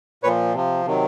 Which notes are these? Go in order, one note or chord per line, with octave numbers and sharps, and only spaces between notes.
A#2 F3 B4 C#5
C3 F3
C3 D#3 F#3